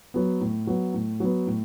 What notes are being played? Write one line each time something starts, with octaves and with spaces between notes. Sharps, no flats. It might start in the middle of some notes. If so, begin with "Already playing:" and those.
F#3 B3
A2
F#3 B3
A2
F#3 B3
A2